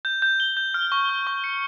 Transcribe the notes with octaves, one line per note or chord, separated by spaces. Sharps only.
G6
G6
G7
G6
F6
C#6
F6
C#6
C#7